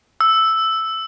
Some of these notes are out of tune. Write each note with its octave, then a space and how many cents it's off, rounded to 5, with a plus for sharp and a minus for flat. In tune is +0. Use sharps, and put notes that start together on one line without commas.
E6 +0